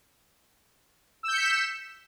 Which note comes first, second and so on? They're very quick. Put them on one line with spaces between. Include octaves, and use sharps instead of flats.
E6 G6 C#7 B6 E7